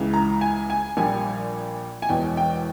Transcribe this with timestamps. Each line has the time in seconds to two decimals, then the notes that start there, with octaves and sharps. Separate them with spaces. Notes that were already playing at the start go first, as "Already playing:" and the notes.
Already playing: C#2 C#3 E3
0.14 A#5
0.41 G#5
0.70 G#5
0.97 A#1 A#2 G3 G#5
2.02 G#5
2.09 E1 E2 B2 G5
2.37 G5